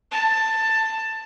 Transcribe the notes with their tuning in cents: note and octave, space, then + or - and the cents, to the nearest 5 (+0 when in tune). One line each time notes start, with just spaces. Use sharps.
A5 +10